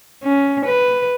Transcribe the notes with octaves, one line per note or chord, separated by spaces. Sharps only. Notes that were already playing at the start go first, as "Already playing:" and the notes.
C#4
B4